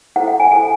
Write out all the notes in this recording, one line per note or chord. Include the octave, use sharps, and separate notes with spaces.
E4 A4 C5 F#5
F#5
G#5
E4 A4 C5 G#5